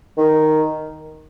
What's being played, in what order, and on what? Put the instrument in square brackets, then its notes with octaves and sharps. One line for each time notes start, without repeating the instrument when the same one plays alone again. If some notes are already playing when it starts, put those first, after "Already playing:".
[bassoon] D#3